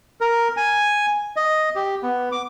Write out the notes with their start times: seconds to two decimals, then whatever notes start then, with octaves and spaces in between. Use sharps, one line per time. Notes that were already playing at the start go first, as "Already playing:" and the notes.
0.21 A#4
0.57 G#5
1.36 D#5
1.76 G4
2.03 B3
2.32 D6